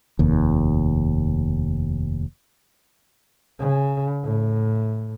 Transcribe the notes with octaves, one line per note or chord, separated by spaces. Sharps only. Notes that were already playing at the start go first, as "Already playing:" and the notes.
F1 D#2
C#3
A2